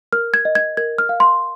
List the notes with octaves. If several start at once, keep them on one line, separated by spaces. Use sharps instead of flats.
A#4 F6
G#6
D#5
G#6
A#4 G#6
F6
F5
C6